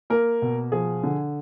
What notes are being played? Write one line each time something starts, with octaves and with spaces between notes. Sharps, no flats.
A#3 A#4
B2
F3 G#4
D3